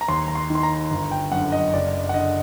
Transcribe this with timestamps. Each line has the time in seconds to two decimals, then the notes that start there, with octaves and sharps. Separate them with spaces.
0.01 A#5
0.08 D#2 C6
0.28 A#5
0.35 C6
0.50 D#3
0.55 C6
0.63 A#5
0.91 G1
1.11 G5
1.31 F#2 D3 F#5
1.52 D#5
1.73 F#1 D5
2.09 F#5
2.14 D3 D#5